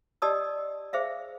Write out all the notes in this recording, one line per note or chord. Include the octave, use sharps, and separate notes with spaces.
G4 D5 D#5 A5 D#6 E6
G#4 C5 E5 F5